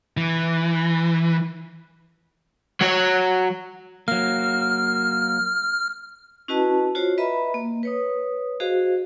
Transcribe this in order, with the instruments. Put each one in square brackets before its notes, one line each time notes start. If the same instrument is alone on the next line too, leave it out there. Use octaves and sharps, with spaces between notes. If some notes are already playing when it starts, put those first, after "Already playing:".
[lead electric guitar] E3
[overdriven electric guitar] F#3 C#5
[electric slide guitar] F#3 A#3 [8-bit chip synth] F6
[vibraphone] C#4 E4 F#4 B4 D#5 A5
F4 F#4 C5 C#5
B4 D#5 E5 A#5 B5
A#3
B4 C#5 D#6
F#4 G#4 C5 D#5 F5